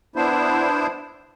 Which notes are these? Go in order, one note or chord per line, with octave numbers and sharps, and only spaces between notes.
B3 D4 E4 C5